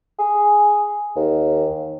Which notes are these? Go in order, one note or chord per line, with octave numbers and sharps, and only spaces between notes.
G#4
D#2